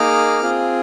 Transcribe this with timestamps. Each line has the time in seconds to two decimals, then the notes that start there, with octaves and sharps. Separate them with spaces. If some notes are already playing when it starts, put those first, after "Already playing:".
Already playing: A#3 D#4 G#4 D6 F6
0.42 C4 F4 G#4